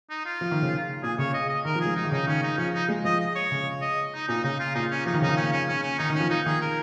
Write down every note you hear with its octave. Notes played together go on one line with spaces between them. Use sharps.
D#4
F4
F3
D#3
C#3
A#2 G#4
C#3 C#5
D#5
D#5
D#3 A#4
F3
G#3 G#4
F3 D#4
D#3
C#3 D#4
D#3 C#4
D#4
F3 C#4
D#4
G#3
F3 D#5
D#5
C#5
C#3
D#5
D#4
A#2 D#4
C#3 D#4
F4
A#2 D#4
C#4
F3 D#4
D#3
C#3 D#4
D#3
C#4
C#4
C#4
C#4
D#3 D#4
D#3
F3 C#4
F3 D#4
D#3 G#4
A#4